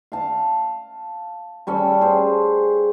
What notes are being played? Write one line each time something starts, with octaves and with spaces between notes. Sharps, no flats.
F5 A5
G3 C#4 A4
G#4 C5